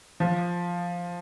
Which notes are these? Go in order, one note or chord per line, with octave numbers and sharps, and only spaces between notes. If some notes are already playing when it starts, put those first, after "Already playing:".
F3